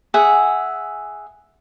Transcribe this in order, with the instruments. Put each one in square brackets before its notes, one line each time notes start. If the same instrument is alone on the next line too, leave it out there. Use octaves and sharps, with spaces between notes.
[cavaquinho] G#4 E5 F#5